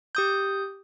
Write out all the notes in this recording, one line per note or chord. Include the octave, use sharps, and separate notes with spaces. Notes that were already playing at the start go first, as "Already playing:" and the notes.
G4 D#6 G6